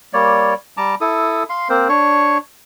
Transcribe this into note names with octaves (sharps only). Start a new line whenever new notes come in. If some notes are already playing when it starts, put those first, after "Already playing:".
G3 A#3 C#5 D5
G3 A5 A#5 D6
E4 A4 D#6
F5 C6
A#3 C4 A#4 C5
D4 C#5 C#6